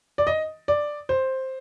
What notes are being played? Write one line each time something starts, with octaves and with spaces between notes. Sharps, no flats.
D5
D#5
D5
C5